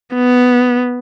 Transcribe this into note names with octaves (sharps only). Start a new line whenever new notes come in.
B3